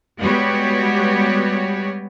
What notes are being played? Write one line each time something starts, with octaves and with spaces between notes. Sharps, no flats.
G3 G#3 B3 F#4 G4 C#5